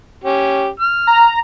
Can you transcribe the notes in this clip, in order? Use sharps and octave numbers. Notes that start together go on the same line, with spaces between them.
C#4 G4
F6
A#5